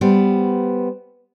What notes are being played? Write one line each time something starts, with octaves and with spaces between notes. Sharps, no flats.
G3 B3 C5